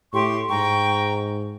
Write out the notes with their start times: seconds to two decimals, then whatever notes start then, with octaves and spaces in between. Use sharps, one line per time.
0.13 A2 G4 C6 C#6
0.50 G#2 G5 A#5 C#6